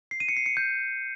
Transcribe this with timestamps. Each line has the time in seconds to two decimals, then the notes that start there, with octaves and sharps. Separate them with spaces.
0.11 C7
0.20 D#7
0.29 C#7
0.37 C7
0.46 C#7
0.57 G6